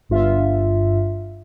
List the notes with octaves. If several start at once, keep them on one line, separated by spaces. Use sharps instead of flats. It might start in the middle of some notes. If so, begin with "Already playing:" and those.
G1 G2 F4 E5